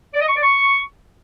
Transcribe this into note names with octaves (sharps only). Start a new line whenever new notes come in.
D5
D#5
C#6
D5
C#6